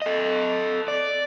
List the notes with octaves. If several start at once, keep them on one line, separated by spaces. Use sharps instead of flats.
A4 D#5
D5